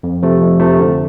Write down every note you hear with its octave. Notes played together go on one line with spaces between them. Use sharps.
F2
C3 F3 A3
F2
C3 F3 A3
D3